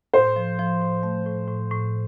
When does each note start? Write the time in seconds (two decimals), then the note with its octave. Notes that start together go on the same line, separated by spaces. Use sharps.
0.13 A2 C5
0.36 F3
0.59 F3
0.81 A2
1.03 A3
1.26 A2
1.48 A2
1.71 A2